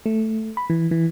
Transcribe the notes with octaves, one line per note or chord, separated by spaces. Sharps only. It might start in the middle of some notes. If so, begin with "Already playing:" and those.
A3
B5
E3
E3